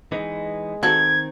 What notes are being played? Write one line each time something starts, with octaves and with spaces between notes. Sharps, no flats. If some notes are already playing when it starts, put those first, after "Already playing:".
E3 G#3 B3 D#4
D#3 C4 F#4 A4 G#6